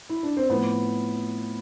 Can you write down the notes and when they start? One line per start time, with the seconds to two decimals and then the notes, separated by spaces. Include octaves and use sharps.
0.09 E4
0.23 D4
0.37 C4
0.50 A2 F3 B3